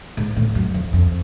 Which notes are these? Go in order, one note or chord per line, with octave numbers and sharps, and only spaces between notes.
G#2
A2
F#2
F2
F2